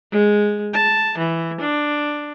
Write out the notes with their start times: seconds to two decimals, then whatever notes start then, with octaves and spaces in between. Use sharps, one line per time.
0.12 G#3
0.73 A5
1.18 E3
1.61 D4